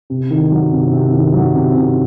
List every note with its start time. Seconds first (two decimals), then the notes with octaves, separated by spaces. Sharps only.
0.10 C3
0.30 D#3
0.52 F#3
0.72 C3
0.93 C3
1.13 D#3
1.34 F#3
1.55 C3
1.76 C3